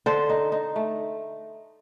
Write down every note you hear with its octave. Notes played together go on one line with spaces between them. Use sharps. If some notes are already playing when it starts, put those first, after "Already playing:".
D3 A4 C5
D#4
D#4
A3